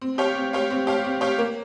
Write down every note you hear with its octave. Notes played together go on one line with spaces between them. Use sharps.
C4
G4 C#5 F5
C4
G4 C#5 F5
C4
G4 C#5 F5
C4
G4 C#5 F5
A#3